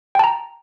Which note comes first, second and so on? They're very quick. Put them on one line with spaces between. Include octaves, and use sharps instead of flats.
G5 A5 A#5